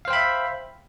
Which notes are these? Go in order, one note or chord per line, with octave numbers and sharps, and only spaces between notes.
C5 E5 F5 G5 B5